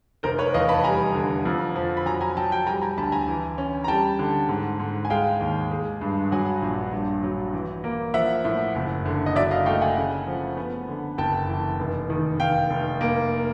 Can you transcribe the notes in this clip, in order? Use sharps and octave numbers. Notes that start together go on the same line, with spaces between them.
F1 A#4 C5
B4 C#5
E2 D#5 F5
A5 B5
G3 G#5 A#5
D3
F2
F3
B5
F#3 G#5 A#5
G#5 A#5
F#3 G5 A5
G5 A5
G3 G#5 A#5
G#5 A#5
D2 A5 B5
G#5 A#5
E3
C#4
A#5
G3 G5 A5
D3
G#2
G#2
G#5
G#3 F5 G5
D#2
G#3
G2
F#3 F#5 G#5
A#1
G2
F#3
E3
A#3
F3 E5 F#5
A2
F#1
D3
D#5
F#3 D5 E5
D#5 F5
A3 F5 G5
F#5 G#5
C#3
F3
B3
D3
F#1 G5 A5
E3
F1
D#3
F1 F5 G5
F1
A#3